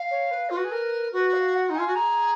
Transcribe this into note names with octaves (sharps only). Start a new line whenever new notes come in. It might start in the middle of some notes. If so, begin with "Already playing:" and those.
Already playing: F5
C#5
B4
F4 B4
F#4
G#4
A#4
F#4 B4
F5
F#5
D#4
F4 G#5
F#4
G#4 A#5